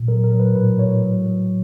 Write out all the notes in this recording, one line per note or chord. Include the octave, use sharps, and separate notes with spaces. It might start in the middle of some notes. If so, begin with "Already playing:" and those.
Already playing: A#2
F#3 A#4
A#4
F#3
B4
A2 B4
A2 C#5
F#3
F#3